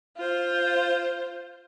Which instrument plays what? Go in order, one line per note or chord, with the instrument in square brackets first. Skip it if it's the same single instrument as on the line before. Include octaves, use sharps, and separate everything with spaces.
[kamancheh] F4 C5